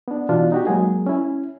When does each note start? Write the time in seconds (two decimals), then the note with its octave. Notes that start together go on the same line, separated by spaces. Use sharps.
0.08 B3 D4
0.29 B2 E3 D4 F4
0.52 D#4 F#4 G4
0.67 F#3 G#3 A#3 G#4
1.06 C#4 E4